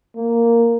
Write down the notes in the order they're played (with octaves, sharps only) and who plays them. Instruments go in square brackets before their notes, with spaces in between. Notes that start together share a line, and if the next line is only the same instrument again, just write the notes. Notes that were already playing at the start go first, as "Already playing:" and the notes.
[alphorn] A#3